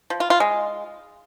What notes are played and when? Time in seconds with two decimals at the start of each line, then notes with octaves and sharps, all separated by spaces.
0.10 F3
0.20 F4
0.30 F4
0.40 G#3